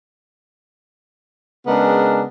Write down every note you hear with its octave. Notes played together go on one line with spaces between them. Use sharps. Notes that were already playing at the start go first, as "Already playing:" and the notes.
C#3 G#3 B3 D4 A#4